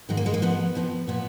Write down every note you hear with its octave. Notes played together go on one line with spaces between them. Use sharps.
G#2 D#3 G#3
A#3
G#3
A#3
G#2 F3 B3
F2 F3
A#2 F3 B3